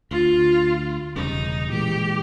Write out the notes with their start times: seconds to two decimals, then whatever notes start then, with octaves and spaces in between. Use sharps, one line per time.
0.11 D2 F4
1.16 E1 C#3 G3 D#4
1.72 A#2 E3 G#3 G4